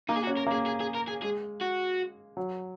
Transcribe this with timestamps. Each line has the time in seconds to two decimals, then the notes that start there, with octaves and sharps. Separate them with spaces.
0.09 A#3 D#4
0.16 G#4
0.23 F#4
0.27 C#4
0.37 A#4
0.47 A#3
0.52 G#4
0.66 G#4
0.80 G#4
0.95 A#4
1.08 G#4
1.22 G#3 G#4
1.61 F#4
2.37 F#3